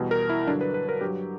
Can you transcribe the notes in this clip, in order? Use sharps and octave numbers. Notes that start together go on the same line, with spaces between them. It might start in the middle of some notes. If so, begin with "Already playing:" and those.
Already playing: E2 B2 G3
A#4
E4
G2 D3 F#3 D4
B4
B4
A#4
G2 F#3 G4